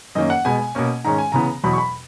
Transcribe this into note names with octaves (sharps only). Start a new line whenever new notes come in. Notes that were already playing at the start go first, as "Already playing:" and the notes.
F#2 D#3 A#3 C#4 D#5
F#5
B2 G#3 B3 G#5
B2 A#3 C#4
G#2 D#3 G#3 C#4 A#5
G#5
C#3 E3 B3 A#5
E2 B2 F#3 B5
C#6
B5